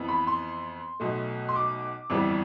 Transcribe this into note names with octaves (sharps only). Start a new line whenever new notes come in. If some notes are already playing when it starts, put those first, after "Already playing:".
Already playing: F2 E3 B3
B5
C6
B1 B2 A3
C6
D6
G1 F2 E3 G3 B3